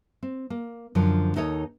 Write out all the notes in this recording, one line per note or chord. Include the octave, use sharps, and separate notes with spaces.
C4
A#3
F#2 D3 F3
D#2 D#4 A4 C#5 D#5